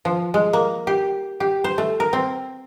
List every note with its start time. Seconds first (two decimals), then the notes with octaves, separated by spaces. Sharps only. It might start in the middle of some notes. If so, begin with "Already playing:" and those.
0.05 F3
0.34 G#3
0.53 A#3
0.87 G4
1.40 G4
1.64 C5
1.78 A3
2.00 A#4
2.13 C4